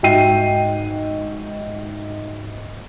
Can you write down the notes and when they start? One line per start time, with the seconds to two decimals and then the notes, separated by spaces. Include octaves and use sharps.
0.03 G#2 F#4 E5 G5 C7 D#7